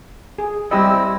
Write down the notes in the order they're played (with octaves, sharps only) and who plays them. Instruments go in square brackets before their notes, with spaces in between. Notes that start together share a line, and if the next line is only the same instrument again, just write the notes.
[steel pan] G#4
[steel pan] G3 G4 D#5 [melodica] C4 E4 E6